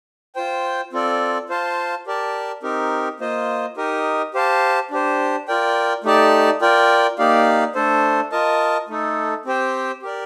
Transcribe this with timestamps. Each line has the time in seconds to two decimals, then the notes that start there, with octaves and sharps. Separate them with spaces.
0.35 F4 C5 G5
0.93 C4 F4 A4 D5
1.49 F4 C5 F5 A5
2.06 G4 A#4 D5 A5
2.63 C4 D#4 G4 A#4
3.20 A#3 F4 C5 D#5
3.77 D#4 G4 A#4 D#5
4.34 G4 C5 F5 A5
4.91 D4 G4 C5
5.48 F4 A#4 D5 G5
6.04 A3 D#4 G4 D5 A5
6.61 F4 A#4 D5 G5
7.18 A#3 D#4 G4 D5 F5
7.75 A3 D4 A4 C5
8.32 F4 A#4 D#5 A5
8.89 A3 D#4 A4
9.45 C4 G4 C5 G5
10.02 G4 A#4 D5